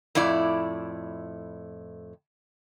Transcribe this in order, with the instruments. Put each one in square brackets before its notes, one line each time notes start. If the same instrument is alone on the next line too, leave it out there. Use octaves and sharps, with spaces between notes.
[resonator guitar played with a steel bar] F2 A2 E4 D5